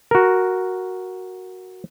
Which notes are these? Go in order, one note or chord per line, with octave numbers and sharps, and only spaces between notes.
F#4 A#4